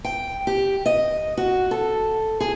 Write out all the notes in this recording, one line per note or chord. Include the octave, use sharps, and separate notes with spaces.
G5
G4
D#5
F#4
A4
G#4